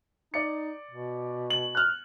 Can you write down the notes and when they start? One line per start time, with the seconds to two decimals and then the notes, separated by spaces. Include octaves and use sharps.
0.34 D#4 D5 C#7
0.91 B2
1.50 F#7
1.75 F6 F#6